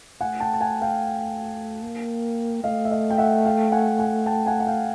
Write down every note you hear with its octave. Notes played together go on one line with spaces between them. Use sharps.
A3 F#5 G#5
G5 A5
A5
F#5 G#5
F5 G5
A#3
A3 D#5 F5
E5
D#5 F5
G5
E5 F#5
F5 G5
F#5 G#5
F#5 G#5
G5 A5
F#5 G#5
F#5
F5 G5